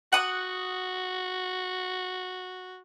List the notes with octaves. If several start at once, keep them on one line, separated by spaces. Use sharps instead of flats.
F#4 F#5 D#6